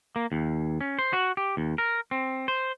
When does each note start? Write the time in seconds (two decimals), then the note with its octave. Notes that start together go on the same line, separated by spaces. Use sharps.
0.16 A#3
0.32 D#2
0.81 C#4
0.99 C5
1.13 F#4
1.37 G4
1.57 D#2
1.78 A#4
2.11 C4
2.48 C5